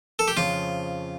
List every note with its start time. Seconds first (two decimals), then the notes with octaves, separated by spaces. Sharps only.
0.19 A4
0.28 G4
0.37 F2 C#3 F3 C#4 F4